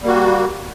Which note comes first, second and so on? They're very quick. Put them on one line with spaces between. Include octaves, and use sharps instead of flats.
G3 A#3 F#4